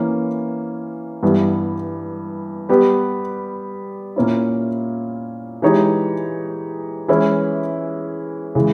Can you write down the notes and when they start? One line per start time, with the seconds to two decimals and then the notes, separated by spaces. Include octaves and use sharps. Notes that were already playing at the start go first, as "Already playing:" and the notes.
Already playing: E3 A#3 C#4
1.23 G2 E3 G3 B3
2.69 G3 B3 G4 B4
4.16 A#2 A#3 C#4 E4
5.62 E3 G#3 D#4 G4 C#5
7.08 E3 G#3 C#4 E4
8.55 C#3 E3 G#3